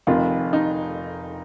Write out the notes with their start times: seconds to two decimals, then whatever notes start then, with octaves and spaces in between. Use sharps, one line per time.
0.07 F1 F2 D#3 F4
0.53 D#4